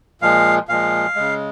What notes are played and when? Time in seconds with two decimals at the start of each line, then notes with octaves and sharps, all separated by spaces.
0.22 A#2 F3 G#3 F5
0.69 A#2 F3 G#3 F5
1.16 C#3 G#3